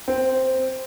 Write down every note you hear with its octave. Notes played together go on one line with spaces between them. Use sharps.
C4